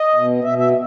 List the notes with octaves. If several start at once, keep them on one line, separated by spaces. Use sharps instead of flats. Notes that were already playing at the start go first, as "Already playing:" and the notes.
Already playing: D#5
B2
B2 E5
E5